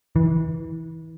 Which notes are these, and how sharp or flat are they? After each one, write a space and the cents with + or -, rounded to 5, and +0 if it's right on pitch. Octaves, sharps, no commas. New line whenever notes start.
E3 -30